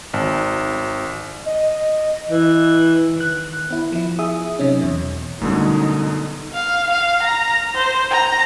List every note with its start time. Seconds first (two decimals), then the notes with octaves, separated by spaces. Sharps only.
0.14 G#1
1.45 D#5
2.30 E3
3.16 D#3 F#6
3.71 B3 E4
3.92 F3 E4
4.19 G#4 E5 D#6
4.59 C3 F#3 C#4 D#4
4.81 E2 B2
5.41 F#2 B2 D3 G3 A3 D#4
6.54 F5
6.90 F5
7.23 A#5
7.74 C5
8.10 A#5